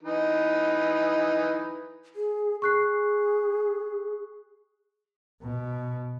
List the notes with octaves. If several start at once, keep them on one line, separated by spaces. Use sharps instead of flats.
E3 D#4 B4
G#4
G#4 C#6 F#6 C7
B2